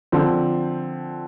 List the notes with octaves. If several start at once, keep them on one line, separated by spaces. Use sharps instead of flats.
D3 F3 C4